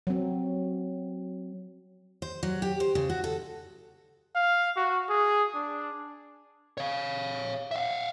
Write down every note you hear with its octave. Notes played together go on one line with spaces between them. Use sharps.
F#3 C4
C5
F#3
G4
C5
C#3
F#4
A4
F5
F#4
G#4
D4
C#5 F5
E5 F5